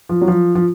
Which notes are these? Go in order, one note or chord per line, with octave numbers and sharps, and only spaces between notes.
F3
F#3
F3
F3